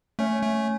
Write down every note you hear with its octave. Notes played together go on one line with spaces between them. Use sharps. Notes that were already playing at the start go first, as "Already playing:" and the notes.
A3 C#4
A3